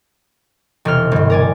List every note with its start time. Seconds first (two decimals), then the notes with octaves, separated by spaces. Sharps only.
0.85 E1 C3 C6 F6
1.12 G1 G2
1.30 A#4 D5 G#5